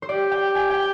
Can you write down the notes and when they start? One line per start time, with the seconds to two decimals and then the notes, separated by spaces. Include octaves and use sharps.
0.02 C5
0.08 G4 D5
0.31 G5
0.55 G#5
0.70 G5